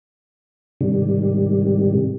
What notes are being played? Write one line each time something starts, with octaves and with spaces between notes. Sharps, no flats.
G#2 C3 D#3 G3